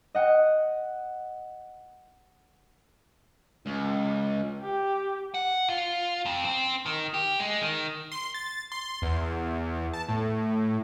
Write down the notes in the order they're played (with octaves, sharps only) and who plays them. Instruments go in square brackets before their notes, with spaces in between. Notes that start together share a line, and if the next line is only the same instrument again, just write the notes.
[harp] D#5 F#5 G5
[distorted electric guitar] C#2
[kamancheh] G4
[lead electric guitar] F#5
F4
F2
C4
D#3
G4
G#3
D#3
[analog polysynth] C6
A6
C6
E2
A5
A2